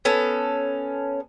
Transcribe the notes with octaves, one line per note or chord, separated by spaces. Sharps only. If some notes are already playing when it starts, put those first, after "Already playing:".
B3 C#4 A4